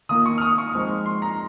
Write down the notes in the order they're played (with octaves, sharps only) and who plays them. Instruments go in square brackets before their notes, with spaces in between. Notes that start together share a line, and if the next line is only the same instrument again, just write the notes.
[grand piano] D#3 A#3 F4 D#6
C#6
F6
D#6
C#6
F3 G#3 C4 D#4
C6
A#5